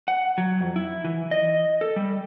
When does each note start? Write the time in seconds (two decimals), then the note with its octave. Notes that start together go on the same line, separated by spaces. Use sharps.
0.08 F#5
0.38 F#3
0.60 F2
0.76 E4
1.05 E3
1.31 D#5
1.81 A4
1.96 G3